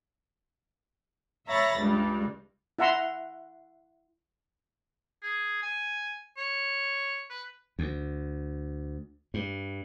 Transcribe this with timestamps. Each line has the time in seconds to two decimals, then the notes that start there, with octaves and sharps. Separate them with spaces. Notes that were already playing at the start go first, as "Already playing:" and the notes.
1.48 C#5 E5 A#5 B5 A6 A#6
1.77 C#2 G2 G3
2.79 E4 E5 F#5 A#5 C6
5.23 G#4
5.62 G#5
6.37 C#5
7.30 B4
7.79 D2
9.34 G2